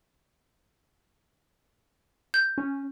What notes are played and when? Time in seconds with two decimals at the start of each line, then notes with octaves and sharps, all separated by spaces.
2.34 G6
2.58 C#4